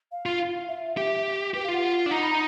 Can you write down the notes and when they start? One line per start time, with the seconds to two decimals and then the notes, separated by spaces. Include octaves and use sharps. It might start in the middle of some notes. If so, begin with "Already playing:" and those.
0.11 F5
0.26 F4
0.68 E5
0.97 G4
1.54 G4 B4
1.63 F5
1.68 F4 F#5
1.82 F#5
2.06 D4
2.10 D#4 A#5
2.21 B5
2.30 A#5